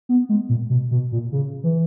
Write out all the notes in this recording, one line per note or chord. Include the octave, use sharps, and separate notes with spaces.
B3
G#3
A#2
B2
B2
A#2
C#3
E3